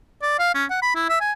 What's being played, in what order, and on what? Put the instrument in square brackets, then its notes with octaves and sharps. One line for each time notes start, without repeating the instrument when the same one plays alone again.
[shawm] D5
F5
C#4
F#5
B5
E4
E5
G#5